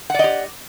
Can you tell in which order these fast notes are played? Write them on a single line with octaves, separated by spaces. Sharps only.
F#5 D5 D#5 G4